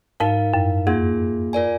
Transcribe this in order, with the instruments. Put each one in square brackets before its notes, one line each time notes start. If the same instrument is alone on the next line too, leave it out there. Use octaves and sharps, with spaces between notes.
[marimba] G#2 [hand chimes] D#4 A#4 F5
[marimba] F#2
[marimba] F2 [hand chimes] A#3 F4 G#4
[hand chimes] F4 A#4 D5 G#5